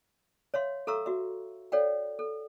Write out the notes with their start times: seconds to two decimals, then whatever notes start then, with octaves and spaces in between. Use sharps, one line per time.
0.54 C#5 E5 F5 C6
0.87 A4 E5 F5 A#5 C#6 E6
1.06 F#4 E5
1.72 A4 C#5 D5 F5 G5
2.19 A4